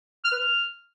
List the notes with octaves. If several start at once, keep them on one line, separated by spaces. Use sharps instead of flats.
F6
B4
F6